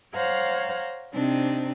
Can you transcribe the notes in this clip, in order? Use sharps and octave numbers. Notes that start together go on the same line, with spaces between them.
C5 C#5 F5 F#5 A#5
C3 C4 D4 D#4